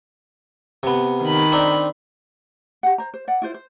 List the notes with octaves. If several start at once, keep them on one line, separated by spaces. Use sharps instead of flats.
C3 B3
D#3 B5
C4 D4 D#4
G4 F#5
C5 A#5
C5
D5 F#5
E4 F4 C5
C5